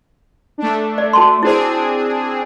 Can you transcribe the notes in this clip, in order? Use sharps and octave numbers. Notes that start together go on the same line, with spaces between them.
A3 D4
D5
F#4 A5 C6
C4 D4 E4 G#4 C5